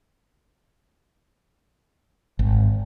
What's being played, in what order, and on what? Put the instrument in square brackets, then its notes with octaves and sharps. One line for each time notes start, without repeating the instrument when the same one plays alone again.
[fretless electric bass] G#1